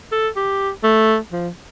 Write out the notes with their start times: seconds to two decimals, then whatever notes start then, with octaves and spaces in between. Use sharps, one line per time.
0.12 A4
0.36 G4
0.84 A3
1.32 F3